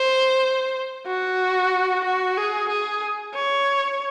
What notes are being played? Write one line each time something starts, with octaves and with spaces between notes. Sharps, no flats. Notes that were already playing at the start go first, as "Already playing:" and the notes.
Already playing: C5
F#4
F#4
G#4
G#4
C#5